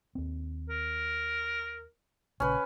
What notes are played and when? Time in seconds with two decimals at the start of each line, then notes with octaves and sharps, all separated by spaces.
0.15 D#2 C4
0.69 A#4
2.40 A#1 C#3 C#4 B4